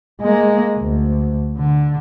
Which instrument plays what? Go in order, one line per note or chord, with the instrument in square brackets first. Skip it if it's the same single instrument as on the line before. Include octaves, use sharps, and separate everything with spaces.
[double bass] G#3 A#3
D2
D3